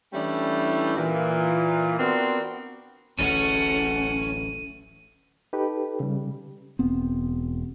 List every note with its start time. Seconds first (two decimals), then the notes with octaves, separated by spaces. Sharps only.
0.13 E3 G3 A3 C#4 D4 E4
0.97 A#2 E3
1.99 B3 C4 D4 F4 F#4 A#4
3.19 D1 A1 A2 C#4 A4 F#5 D#7
5.53 D#4 G4 A4 B4
6.00 C#3 G3
6.79 E1 B3 C4